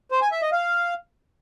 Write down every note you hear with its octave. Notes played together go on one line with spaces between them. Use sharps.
C5
G#5
E5
D#5
F5